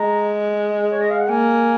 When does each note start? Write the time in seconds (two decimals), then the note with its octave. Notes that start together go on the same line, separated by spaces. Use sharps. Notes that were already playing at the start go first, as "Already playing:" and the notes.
Already playing: G#3 A#5
0.92 C#5
1.01 D#5
1.11 F5
1.20 F#5
1.29 A#3 G#5